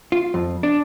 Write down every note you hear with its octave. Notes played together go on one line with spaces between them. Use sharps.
F4
F2
D4